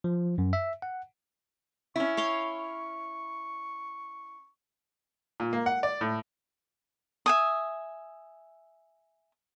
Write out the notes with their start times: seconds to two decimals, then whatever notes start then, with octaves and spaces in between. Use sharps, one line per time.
0.04 F3
0.38 F#2
0.53 E5
0.82 F#5
1.96 C#4 E4 C#6
2.17 C#5 F5 C6
5.40 A#2
5.53 A#3
5.66 F#5
5.83 D5
6.01 A2
7.26 E5 G#5 D#6